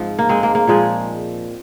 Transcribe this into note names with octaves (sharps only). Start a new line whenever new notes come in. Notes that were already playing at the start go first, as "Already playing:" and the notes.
Already playing: G#2 F3 C4
A#3
G#3 C4
A#3
A#3
A#2 F3 G#3